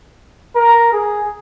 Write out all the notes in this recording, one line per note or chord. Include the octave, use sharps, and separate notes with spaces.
A#4
G#4